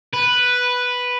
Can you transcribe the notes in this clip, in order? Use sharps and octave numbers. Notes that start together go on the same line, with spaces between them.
B4